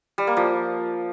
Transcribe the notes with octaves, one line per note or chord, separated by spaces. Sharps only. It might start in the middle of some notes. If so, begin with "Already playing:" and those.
G3
A#3
F3